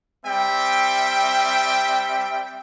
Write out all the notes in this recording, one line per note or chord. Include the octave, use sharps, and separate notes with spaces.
G3 C4 E5 G5